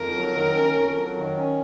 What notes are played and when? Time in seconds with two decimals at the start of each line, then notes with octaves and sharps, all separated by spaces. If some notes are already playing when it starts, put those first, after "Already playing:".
Already playing: F2 A#4
0.13 F#3
0.34 D#3
0.54 C#4
0.75 F2
0.95 F#3
1.16 D#3
1.37 C#4